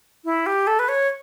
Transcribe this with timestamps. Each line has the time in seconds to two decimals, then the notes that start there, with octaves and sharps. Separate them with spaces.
0.25 E4
0.46 G4
0.67 A4
0.79 B4
0.89 C#5